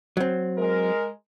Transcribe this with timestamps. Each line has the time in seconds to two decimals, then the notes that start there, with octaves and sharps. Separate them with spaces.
0.17 F#3 C4
0.58 G#3 A#4